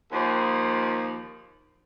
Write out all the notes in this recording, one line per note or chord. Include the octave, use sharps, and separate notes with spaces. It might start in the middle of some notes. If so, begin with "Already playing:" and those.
D#2 F3